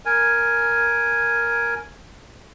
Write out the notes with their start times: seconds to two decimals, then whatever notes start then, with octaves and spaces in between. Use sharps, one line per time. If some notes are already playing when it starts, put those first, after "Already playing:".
0.05 A#4 G#5